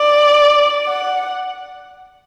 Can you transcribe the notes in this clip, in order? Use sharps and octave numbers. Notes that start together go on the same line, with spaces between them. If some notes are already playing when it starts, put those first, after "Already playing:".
Already playing: D5
F#5